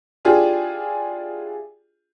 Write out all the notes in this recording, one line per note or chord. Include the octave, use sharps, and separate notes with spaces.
D4 E4 F4 G4 G#4